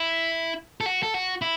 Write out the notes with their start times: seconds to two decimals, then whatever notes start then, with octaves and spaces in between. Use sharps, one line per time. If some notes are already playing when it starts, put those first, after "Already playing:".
Already playing: E4
0.81 A4
0.86 F#4
1.03 A4
1.14 F#4
1.42 E4